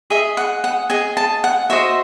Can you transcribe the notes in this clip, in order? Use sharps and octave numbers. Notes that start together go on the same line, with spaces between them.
G#4 D#5 E5
F#5
F#5
G#4 D#5 G#5
A5
F#5
F#4 C5 D#5 E5